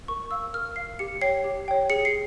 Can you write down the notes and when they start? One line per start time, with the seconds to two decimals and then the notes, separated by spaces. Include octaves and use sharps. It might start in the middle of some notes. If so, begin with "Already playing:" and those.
0.08 A#4 C#6
0.31 F5 E6
0.54 A#4 F6
0.76 F5 C7
0.99 G4 C#7
1.22 C#5 G5 C7
1.44 G4
1.68 C#5 G5
1.90 G#4 C#7
2.05 C7